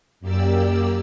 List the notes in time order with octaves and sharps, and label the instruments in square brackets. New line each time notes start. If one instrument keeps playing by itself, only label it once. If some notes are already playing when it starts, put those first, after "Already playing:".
[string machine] F#2 A#3 G4 D5 E6